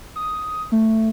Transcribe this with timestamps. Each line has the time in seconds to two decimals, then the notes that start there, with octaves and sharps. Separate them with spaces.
0.16 D#6
0.72 A3